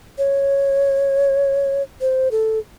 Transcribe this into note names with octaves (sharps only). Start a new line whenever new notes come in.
C#5
C5
A4